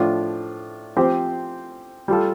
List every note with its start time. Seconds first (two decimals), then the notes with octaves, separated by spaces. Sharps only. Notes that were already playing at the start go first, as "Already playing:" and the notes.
Already playing: A2 F3 D4 F4
0.97 F3 C4 G4 C5
2.08 G3 F4 A4